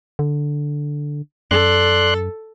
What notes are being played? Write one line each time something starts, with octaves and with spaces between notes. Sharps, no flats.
D3
F#2 A4 D5 C6 F#6